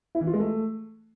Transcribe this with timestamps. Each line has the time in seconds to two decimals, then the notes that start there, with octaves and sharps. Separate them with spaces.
0.15 E4
0.21 E3
0.27 F4
0.33 G#3
0.40 A3